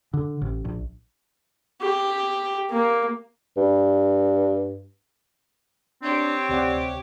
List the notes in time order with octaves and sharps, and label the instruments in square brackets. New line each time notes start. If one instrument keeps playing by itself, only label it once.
[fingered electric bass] D3
A1
A#1
[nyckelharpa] G4
A#3
[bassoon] G2
[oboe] C4 [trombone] D4 [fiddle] G4 C#5
[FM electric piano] D2 D5 F#5 [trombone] C3